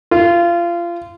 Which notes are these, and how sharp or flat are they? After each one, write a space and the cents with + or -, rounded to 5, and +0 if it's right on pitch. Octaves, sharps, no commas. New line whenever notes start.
F4 -25